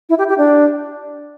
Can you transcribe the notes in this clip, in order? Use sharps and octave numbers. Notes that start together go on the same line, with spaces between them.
E4
G4
G4
D4